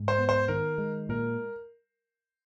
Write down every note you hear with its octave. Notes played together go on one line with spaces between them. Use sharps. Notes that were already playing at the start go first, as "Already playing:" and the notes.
Already playing: G#2
C5
B3
C5
D#3 A#4
G#3
A#2 A#4